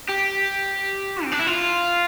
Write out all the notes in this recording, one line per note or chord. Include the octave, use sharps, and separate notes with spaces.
G4
C4
D4
E4
F4